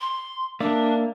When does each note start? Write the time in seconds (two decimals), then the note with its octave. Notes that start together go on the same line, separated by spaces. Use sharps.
0.01 C6
0.60 A#3 D4 D5 E5